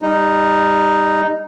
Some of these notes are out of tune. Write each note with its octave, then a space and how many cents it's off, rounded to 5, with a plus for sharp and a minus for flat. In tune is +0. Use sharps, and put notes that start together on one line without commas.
G3 +20 D#4 +0